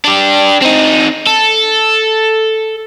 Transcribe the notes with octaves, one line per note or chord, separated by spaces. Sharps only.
D4 G4
C4 D#4
A4